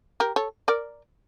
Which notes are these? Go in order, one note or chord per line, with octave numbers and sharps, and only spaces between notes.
G4 A#4
A4 C#5
A#4 D5